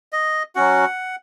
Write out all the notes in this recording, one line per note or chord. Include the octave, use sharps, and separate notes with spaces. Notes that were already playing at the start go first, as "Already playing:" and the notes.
D#5
F#3 C#4 F#4 F#5